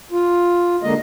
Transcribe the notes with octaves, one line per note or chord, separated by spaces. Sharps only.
F4
D3 G#3 A#3 D#5